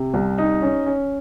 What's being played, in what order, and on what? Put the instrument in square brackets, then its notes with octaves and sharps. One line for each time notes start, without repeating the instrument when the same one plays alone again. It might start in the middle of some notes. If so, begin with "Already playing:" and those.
Already playing: [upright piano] C3
C2
D#4
C#4
C#4